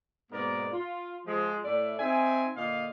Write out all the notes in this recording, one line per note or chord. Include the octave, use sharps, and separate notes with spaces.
G#2 B2 A#3 B3 A#4 D5
F4
F3 G#3
A2 D5 E5
C4 D#4 E5 G#5
A#2 D3 D#5 F5